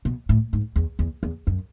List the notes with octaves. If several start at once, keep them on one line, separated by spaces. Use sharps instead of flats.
B2
A2
G#2
E2
E2
E2
F#2